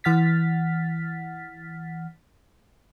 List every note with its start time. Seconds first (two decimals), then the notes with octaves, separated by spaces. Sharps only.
0.04 E3 F#5 F6 A6 B6